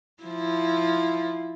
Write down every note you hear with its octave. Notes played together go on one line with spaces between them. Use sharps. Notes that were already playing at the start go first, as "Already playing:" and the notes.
F3 E4